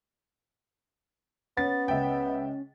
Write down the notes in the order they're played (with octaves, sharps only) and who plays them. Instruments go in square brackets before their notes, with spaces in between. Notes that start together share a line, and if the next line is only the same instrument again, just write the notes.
[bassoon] B3 [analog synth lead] C#4 [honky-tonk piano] A6
[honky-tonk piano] C#2 E5 G5